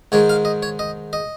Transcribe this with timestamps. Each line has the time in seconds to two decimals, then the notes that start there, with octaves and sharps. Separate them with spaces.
0.12 G#2 D#3 G#3 C#5
0.29 F5
0.45 D#5
0.63 C#5
0.79 D#5
1.13 D#5